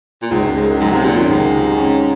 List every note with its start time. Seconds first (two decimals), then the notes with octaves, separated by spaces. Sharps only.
0.22 A#2
0.31 C#2 G#2
0.43 F#2
0.55 G#2 G#3
0.68 F#2
0.80 G#2 F#3
0.92 C3
1.05 A#2 D#3
1.17 F#2
1.29 C#2 G#2
1.53 C3
1.77 C#4